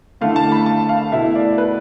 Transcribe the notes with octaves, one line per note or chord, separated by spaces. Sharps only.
D3 A3 E4 F5
A5
B5
A5
F5
B2 A3 E4 E5
D5
B4